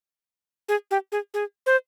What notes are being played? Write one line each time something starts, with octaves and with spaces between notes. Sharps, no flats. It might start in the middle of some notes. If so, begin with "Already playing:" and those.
G#4
G4
G#4
G#4
C5